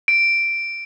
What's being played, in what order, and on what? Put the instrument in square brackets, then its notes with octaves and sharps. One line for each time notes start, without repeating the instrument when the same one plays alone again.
[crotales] D7